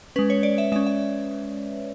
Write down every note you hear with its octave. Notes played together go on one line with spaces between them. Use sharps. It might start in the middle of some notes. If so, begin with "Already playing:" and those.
G#3 C#4 B4
C#5
D5
E5
G#3 C#4 E5
E5